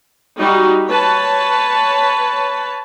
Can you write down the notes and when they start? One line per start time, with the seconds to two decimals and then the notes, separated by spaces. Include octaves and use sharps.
0.38 G3 D#4 F#4
0.88 B4 C#5 A5